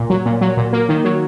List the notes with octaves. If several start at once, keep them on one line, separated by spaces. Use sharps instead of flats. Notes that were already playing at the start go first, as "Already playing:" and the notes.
Already playing: A#2
F#3
A#2
F#3
A#2
A#3
D#3
F#3